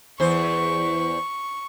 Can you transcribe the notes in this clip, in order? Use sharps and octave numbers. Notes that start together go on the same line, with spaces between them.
E2 C5 C#6